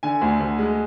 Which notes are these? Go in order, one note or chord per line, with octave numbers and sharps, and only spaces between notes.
D3 G#5
D2
D2
G#3